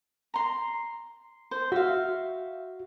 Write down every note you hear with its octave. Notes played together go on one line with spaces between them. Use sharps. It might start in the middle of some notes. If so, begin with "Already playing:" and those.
A#5 C6
C5
F#4 E5 F5